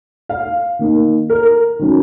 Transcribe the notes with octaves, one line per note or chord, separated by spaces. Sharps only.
F5
D#3 A#3 D#4
A#4
D#3 F#3 C#4